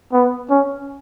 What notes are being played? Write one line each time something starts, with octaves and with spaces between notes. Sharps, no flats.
B3
C#4